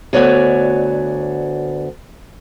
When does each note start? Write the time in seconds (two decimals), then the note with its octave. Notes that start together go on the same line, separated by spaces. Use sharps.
0.13 D2 B3 F#4 C#5 D5 G#5